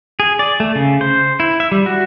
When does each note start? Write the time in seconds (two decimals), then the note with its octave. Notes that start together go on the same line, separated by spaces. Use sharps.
0.20 G#4
0.39 D5
0.60 A3
0.75 C#3
1.01 C5
1.40 E4
1.60 E5
1.72 G3
1.86 F#4